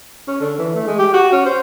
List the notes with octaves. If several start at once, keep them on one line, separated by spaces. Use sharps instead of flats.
C#4
D3
E3
A3
G#3
G4
F#4
C#4
C5